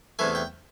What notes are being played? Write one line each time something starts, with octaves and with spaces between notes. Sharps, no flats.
E2 C3 E3 A3 G#5
G5